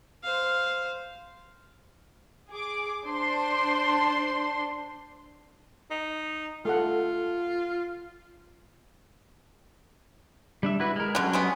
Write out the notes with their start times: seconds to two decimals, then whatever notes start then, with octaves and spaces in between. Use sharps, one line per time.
0.24 C5 F5
2.50 G#4 D6
3.07 D4 C5 C6
5.90 D#4
6.65 A3 F4 A4 F#5
10.63 G3 D4 E5
10.80 E4 F#4 B4
10.96 G#3 A#4
11.15 D3 F#3 G3 C#4 F#5
11.33 G3 G#3 B3